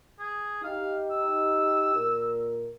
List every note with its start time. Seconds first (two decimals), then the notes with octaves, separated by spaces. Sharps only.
0.19 G#4
0.64 D#4 G4 F5
1.11 E6
1.95 A#2 A#4